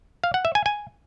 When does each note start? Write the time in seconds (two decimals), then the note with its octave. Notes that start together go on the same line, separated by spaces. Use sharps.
0.24 F5
0.34 F#5
0.45 E5
0.55 G#5
0.66 G#5